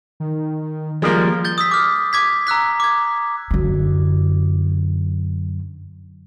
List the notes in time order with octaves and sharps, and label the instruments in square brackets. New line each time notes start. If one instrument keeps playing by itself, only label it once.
[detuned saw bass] D#3
[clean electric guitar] F3 G3 [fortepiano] G#3 A#3
[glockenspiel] G6 A6 G7
D#6 E6 B6
D6 F6
D6 G#6 B6
A#5 E6 F#6 B6
D6 G#6
[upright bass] F#2 D3